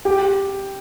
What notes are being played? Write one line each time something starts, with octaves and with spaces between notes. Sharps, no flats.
G4